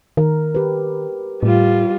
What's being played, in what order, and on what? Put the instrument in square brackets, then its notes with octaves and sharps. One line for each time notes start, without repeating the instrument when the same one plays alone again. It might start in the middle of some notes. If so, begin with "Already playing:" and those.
[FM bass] D#3 [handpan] A#4
[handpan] G4 B4
[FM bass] A2 [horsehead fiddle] G3 F4